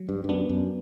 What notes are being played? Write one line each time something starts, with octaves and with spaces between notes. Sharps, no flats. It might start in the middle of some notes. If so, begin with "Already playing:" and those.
Already playing: F#3
G2
G2
F#2 B3 D4
F#2